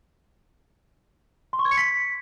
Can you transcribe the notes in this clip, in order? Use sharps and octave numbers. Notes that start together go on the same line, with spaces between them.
C6
C#6
G#6
C#7
B6